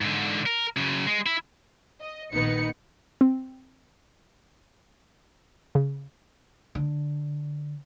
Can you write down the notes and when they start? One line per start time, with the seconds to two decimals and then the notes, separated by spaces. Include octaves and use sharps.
0.01 G#2 D3
0.46 A#4
0.77 F#2 C#3
1.07 G#3
1.26 E4
2.01 D#5
2.33 A#1 D#3 B3 D#4 B4 C#7
3.21 C4
5.75 C#3
6.75 D3